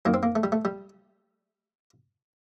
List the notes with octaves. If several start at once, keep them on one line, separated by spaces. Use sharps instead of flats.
F#2 D#3 A#3
C4
A#3
A3
G3
A3
G3